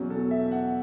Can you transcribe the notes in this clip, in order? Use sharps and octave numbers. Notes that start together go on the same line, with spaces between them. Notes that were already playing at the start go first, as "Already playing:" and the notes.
Already playing: E2 B2 F#3 C#4
A4
E5
F#5